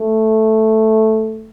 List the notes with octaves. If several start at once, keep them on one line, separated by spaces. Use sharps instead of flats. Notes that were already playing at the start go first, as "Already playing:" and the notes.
Already playing: A3